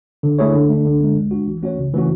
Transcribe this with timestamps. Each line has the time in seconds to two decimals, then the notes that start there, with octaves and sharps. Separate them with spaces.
0.23 D3
0.39 A3 E4 G#4 C#5
0.54 D3
0.69 A3 D4
0.85 D3
1.00 G#3 B3
1.16 G#3
1.31 D4 F#4
1.46 E3
1.62 A3 C#4 F#4 C#5
1.78 C#3
1.94 E3 A3 C#4 F#4